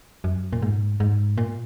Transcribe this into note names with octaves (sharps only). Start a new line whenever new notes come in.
F#2
A#2
G#2
G#2
A#2